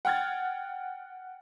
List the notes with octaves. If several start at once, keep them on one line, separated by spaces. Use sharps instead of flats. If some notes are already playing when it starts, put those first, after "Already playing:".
F#5 G5 F6 G#6 A6